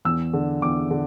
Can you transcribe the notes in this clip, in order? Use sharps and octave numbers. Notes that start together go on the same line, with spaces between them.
E2 E6
D3
E2 D6
D3